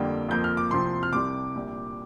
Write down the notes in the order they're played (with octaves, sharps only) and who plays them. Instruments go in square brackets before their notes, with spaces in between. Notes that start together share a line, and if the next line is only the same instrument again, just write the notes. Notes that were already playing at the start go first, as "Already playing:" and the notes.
Already playing: [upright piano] F2 D3 G3 A#3 [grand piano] G5
[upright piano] F2 F3 A#3 [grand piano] G6
[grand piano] F6
D6
[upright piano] C2 C3 F3 C4 [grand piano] C6
[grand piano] F6
[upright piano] C2 C3 G3 [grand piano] D6
[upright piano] A#1 A#2 G3